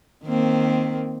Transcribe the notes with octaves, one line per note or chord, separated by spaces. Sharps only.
D#3 A#3 C4